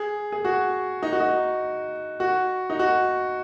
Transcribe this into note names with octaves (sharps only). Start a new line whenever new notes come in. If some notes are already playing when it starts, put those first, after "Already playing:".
Already playing: G#4
G#4
F#4
D#4
F#4
D#4
F#4
D#4
F#4